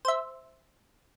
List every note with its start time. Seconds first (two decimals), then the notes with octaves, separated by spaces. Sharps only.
0.05 C5 E5